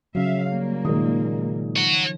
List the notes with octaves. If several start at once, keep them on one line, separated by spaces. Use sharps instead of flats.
C#3 F3 F#3 E5 F5
G3 A#3
A#2 D#3 G#3 D#6
F3 C#5 F#5